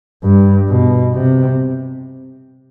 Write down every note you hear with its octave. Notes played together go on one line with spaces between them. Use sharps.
G2
B2
C3